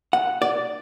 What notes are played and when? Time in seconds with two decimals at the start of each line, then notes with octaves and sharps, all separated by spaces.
0.13 F#5
0.42 D5